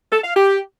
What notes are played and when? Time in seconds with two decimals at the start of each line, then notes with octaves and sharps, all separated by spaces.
0.12 A4
0.23 F5
0.35 G4